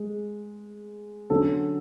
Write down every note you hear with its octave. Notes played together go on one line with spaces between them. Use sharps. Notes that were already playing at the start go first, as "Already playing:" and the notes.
Already playing: G#3
D3 F#3 C#4 A4